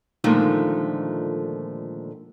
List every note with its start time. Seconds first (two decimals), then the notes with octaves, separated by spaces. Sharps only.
0.24 A#2 D3 D#3 F3 G#3 A3